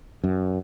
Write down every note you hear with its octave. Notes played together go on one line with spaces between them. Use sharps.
F#2